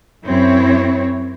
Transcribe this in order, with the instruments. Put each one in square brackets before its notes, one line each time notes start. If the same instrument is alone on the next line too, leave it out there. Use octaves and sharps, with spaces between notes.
[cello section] F#2 C4 E4 C#5